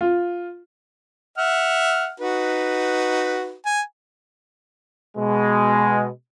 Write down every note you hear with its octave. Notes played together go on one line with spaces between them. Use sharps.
F4
E5 F#5 F6
D#4 F#4 B4
G#5
B2 G#3